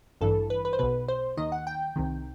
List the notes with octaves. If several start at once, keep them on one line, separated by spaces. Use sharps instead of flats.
A1 G2 E3 A4
B4
B4
C5
B1 B2 B4
C5
D#2 D#3 D#5
F#5
G5
C2 C3 D#3